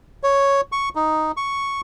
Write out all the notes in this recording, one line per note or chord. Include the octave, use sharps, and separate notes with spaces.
C#5
C#6
D#4
C#6